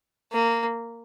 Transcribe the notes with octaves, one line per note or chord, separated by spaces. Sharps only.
A#3